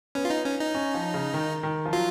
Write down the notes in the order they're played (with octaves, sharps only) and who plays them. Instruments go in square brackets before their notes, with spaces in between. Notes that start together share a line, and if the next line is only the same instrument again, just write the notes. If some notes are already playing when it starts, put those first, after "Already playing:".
[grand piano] B3 [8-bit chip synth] C#4
[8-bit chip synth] F4
D#4
C#4
D#4
[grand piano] C#4
F3
C#3
D#3
D#3
F3
[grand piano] F#3 [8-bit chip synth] F4